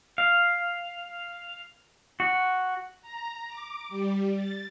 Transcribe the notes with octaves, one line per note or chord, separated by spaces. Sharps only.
F5
F#4
A#5
D6
G3
A6